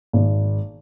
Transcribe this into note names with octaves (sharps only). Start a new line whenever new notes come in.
G#1